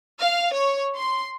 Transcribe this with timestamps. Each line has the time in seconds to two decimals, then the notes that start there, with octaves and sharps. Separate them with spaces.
0.20 F5
0.54 C#5
0.96 C6